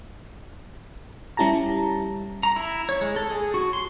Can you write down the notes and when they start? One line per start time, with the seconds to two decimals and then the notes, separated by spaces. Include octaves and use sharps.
1.37 G3 C#4 E4 G4 A5 A#5
2.43 A#5
2.56 E4
2.89 C#5
3.01 G#3
3.16 A4
3.30 G#4
3.54 F#4
3.73 C6